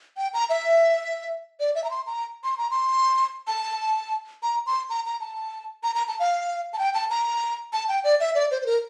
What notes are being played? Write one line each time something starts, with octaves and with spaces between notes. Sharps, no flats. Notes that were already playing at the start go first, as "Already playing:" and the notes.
G5
A#5
E5
D5
E5
A#5
C6
A#5
C6
A#5
C6
A5
A#5
C6
A#5
A#5
A5
A#5
A#5
A5
F5
A5
G5
A5
A#5
A5
G5
D5
E5
D5
C5
C5
A#4